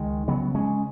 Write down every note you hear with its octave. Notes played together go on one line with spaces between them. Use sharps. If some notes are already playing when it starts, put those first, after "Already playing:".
Already playing: C#2 D#3 G#3
C#3 F#3 B3
G#3 C#4